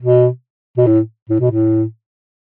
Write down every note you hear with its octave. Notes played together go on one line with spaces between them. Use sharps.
B2
B2
A2
A2
B2
A2